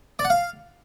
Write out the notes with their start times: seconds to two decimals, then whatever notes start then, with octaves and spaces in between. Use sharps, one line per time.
0.19 D5
0.25 F#5
0.30 F5